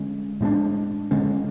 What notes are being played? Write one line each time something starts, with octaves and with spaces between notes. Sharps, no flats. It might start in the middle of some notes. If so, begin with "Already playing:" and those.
Already playing: D3 G#3 C#4
A2 G#3 B3 D4
D3 G#3 C#4